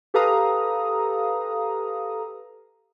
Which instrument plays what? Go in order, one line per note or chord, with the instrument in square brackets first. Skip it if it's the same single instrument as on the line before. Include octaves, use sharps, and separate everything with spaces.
[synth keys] G4 A4 B4 F5 A#5 D#6